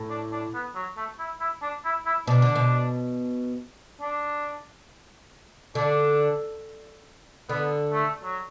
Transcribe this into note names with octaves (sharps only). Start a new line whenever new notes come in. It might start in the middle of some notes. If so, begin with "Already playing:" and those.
Already playing: A2
D4
D4
B3
F#3
A3
E4
E4
D4
E4
E4
B2 D4
D3
B2
D4
D3 D4
D3 B3
A3
F#3